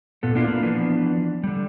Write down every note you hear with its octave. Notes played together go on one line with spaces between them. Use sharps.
A#2 B3 A4
A#3 B3 D4 E4 F4
A#3 B4
E3 F3 B3 D4
D3 G3